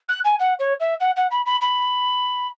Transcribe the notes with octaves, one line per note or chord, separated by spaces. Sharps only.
F#6
G#5
F#5
C#5
E5
F#5
F#5
B5
B5
B5